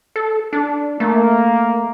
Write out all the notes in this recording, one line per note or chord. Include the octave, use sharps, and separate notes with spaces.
A4
D4
A3 A#3